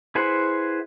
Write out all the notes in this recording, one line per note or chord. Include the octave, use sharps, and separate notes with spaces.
E4 G#4 B4 C5 F#5